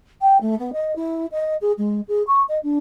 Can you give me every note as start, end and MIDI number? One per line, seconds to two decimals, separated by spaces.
0.21 0.37 79
0.41 0.57 57
0.58 0.70 59
0.72 0.94 75
0.95 1.26 64
1.31 1.54 75
1.61 1.72 68
1.77 2.00 56
2.08 2.22 68
2.27 2.42 85
2.48 2.57 75
2.62 2.78 62